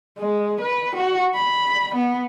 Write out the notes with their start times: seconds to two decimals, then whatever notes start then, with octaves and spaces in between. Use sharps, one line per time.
0.18 G#3
0.61 B4
0.95 F#4
1.35 B5
1.95 B3